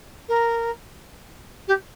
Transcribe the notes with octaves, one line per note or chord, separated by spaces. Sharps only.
A#4
G4